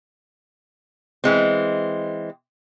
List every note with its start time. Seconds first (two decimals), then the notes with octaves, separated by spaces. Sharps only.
1.24 E3 G#3 C4